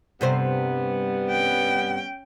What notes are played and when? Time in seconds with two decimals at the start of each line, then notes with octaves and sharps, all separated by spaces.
0.21 G2 C3 G3 B3 C5
1.31 C#4 G5